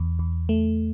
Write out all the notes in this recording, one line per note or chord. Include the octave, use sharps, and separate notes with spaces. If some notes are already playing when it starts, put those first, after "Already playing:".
Already playing: E2
E2
A3